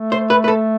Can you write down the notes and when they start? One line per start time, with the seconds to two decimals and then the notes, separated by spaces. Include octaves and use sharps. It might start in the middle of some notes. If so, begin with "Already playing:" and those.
Already playing: A3
0.12 C5
0.30 B4
0.44 B4
0.48 A4